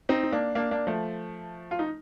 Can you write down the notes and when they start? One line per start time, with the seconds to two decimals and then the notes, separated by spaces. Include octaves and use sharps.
0.09 C4 D#4
0.23 D#4
0.32 A#3 D4
0.55 A#3 D4
0.71 A#3 D4
0.87 F3 A3
1.71 F4
1.79 D#4